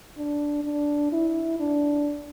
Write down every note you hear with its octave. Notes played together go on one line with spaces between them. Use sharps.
D4
D4
E4
D4